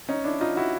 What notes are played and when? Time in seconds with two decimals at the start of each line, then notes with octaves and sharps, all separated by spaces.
0.09 C#4 D#4
0.24 D4 E4
0.41 D#4 F4
0.57 E4 F#4